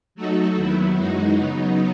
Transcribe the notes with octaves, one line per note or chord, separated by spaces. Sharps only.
F#3 A3 D#4 F#4 A4
D#2 D#3 F#3 B3 E4
F#2 E3 G#3 D#4 F#4
C#3 F#3 B3 D#4